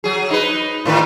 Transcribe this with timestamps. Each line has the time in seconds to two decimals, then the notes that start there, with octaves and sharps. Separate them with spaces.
0.04 F#3 G#4
0.30 D#4 B4
0.85 A2 D#3 B4